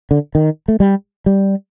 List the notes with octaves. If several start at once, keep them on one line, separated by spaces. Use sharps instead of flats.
D3
D#3
A3
G3
G3